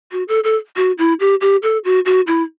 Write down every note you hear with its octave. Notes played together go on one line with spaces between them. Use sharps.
F#4
A4
A4
F#4
E4
G4
G4
A4
F#4
F#4
E4